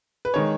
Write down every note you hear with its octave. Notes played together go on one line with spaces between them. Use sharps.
B4
D#3 G#3 C#5